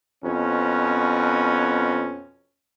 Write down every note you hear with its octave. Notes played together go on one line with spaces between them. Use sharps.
F2 B2 C#4